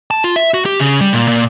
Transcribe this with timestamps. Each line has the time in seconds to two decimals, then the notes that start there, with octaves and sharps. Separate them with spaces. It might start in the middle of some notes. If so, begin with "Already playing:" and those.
0.11 A5
0.24 F4
0.36 E5
0.54 F#4
0.66 G4
0.80 C#3
1.01 G3
1.13 A#2
1.28 A#2